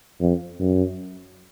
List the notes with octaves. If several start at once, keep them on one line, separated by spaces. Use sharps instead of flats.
F2
F#2